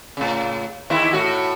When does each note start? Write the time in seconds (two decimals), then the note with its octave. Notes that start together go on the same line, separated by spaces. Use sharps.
0.17 A2 C#3
0.90 D#2 D#3 E4
1.13 A2 F#4